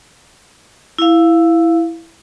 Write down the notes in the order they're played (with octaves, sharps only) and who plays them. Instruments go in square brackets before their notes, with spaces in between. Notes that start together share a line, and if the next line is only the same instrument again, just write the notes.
[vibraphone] E4 F5